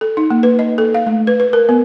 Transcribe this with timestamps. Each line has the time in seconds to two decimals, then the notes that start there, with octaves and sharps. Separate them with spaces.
0.01 A4
0.17 D#4
0.30 A#3
0.43 B4
0.59 D#5
0.78 A4
0.94 F5
1.06 A3
1.27 B4
1.40 B4
1.53 A#4
1.69 B3